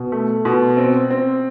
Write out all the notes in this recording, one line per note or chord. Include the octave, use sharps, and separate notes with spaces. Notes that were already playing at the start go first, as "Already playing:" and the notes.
Already playing: B2
A3
B2
C4
C4